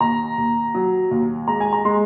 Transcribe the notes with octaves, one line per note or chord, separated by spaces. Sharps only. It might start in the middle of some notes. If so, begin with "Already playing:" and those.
D#2 A#5
D#2
F#3
D#2
G#3 A#5
G#5
A#5
G#3 C6